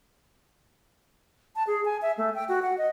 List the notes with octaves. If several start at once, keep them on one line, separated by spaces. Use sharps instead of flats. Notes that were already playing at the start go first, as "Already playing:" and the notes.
A5
G#4
G#5
E5
A3
G5
F#4
F#5
D#5